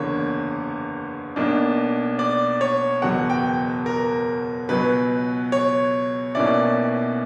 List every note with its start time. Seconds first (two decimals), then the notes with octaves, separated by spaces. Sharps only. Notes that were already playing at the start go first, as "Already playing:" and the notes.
Already playing: F#1 E2 D3 A#3 C#5
1.36 B1 B2 A#3 D4
2.19 D5
2.61 C#5
3.02 F#1 E2 B2 F#3 F#5
3.30 G5
3.86 A#4
4.69 C#2 B2 F#3 B4
5.52 C#5
6.35 B1 B2 A#3 C#4 E4 D5